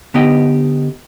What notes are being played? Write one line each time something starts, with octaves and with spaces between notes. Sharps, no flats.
D3 B3 D#4 G4 D#5